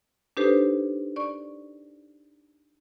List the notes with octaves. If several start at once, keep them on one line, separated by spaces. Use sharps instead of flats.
D4 D#4 G4 A4 B4 C5
D5 C#6